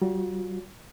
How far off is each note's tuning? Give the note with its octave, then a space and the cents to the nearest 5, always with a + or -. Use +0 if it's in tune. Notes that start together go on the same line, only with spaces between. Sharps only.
G3 -45 F4 +45 C#5 +20